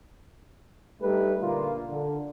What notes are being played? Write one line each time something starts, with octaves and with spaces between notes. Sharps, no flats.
G3 A3 D#4 G4 B4
A#2 D3 A#3 F4
D3